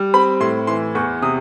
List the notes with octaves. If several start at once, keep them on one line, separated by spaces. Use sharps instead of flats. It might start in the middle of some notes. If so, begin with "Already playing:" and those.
Already playing: G3
C4 B5
A2 C6
E3 C6
E2 C#6
C3 D#6